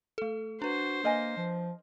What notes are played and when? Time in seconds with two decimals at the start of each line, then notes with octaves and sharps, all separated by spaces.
0.18 A3 A4
0.62 D4 F#4 B4 C5
1.04 A#3 A#4 D#5 G#5
1.37 F3